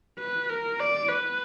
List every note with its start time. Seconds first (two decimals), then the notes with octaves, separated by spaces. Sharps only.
0.19 B4
0.49 A#4
0.80 D5
1.09 B4